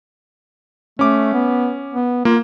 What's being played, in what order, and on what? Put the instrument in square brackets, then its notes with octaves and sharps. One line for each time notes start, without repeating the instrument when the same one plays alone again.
[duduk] A3 [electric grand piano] C#4 D6
[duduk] B3
B3
[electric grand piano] A#3 [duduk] F4